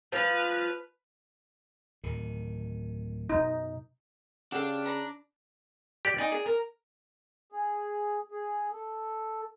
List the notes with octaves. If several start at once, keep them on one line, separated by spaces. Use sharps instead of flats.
F3 B4 F6
D1 D#3
F#2 B2 D#4
C#3 D4 G4 A4 F5 F#5
D5 A#5 B5
G4 D5
D#4 D5 G#5 D#6
G#4
A#4
G#4
G#4
A4